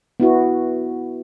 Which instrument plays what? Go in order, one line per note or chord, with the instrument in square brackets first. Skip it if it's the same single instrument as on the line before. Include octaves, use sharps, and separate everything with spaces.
[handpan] B3 E4 F#4